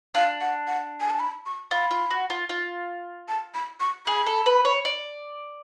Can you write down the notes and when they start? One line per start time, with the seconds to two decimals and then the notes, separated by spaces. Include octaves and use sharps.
0.15 D4 F5
0.41 F#5
0.67 F#5
1.01 G#5
1.10 A5
1.20 B5
1.46 C#6
1.71 F4 B5
1.91 F4
2.11 F#4
2.30 F4
2.49 F4
3.28 A5
3.54 B5
3.80 C#6
4.07 G#4 B5
4.26 A4
4.46 B4
4.65 C#5
4.85 D5